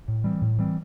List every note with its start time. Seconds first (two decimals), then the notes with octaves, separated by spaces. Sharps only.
0.08 A2
0.24 E3 G3 C4
0.42 A2
0.59 E3 G3 C4